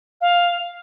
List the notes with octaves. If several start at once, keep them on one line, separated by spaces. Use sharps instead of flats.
F5